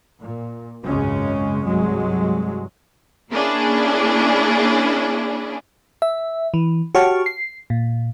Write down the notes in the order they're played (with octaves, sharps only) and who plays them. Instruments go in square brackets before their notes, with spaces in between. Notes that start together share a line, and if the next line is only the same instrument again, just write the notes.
[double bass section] A#2
G#1 C#2 F#2 C#3 G#3 C#4
C2 G2 F#3 G#3
[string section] A#3 C#4 D4 E4 G#4
[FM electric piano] E5
E3
F#4 G4 C#5 A5 C#6 F6
C7
A#2